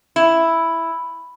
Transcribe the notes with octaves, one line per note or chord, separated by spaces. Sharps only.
E4